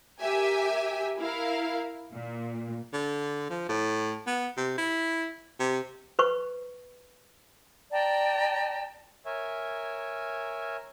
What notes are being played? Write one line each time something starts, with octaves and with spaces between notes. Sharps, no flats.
G4 A#4 E5 G#5
E4 A#4 F5
A#2
D3
F3
A2
B3
C3
E4
C3
B4 C5 C#6
D5 G5 A5 A#5
A#4 C#5 E5 G#5